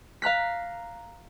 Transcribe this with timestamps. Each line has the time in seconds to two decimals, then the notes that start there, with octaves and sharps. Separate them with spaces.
0.22 F5 A#5 F#6 B6